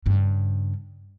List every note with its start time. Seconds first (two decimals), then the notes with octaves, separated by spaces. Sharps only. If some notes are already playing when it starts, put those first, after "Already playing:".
0.06 G2 C#3